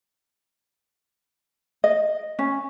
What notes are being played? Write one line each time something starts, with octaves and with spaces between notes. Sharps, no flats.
D#5
C#4